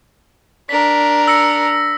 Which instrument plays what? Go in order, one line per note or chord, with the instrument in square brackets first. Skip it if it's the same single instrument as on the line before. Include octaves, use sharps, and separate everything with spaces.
[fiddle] D4 A#4 [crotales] B6
[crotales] E6 A#6 C#7